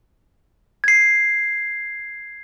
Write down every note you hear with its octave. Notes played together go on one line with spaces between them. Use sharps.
G#6 C7